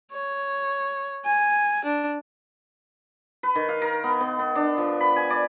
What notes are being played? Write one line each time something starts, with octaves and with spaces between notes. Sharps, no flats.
C#5
G#5
D4
B4
D#3
F5
A#4
B3
B3
B3
D4
F3
B5
G#5
D5